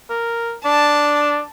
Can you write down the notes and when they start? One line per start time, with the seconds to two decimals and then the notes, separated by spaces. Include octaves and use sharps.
0.10 A#4
0.65 D4 A5